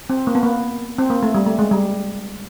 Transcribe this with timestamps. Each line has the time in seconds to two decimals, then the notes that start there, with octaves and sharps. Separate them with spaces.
0.10 C4
0.27 A#3
0.35 B3
0.43 A#3
0.98 C4
1.10 A#3
1.23 A3
1.35 G3
1.46 A3
1.59 G#3
1.71 G3